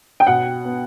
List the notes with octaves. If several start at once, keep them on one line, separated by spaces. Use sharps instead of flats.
G5
B2 F#5
B3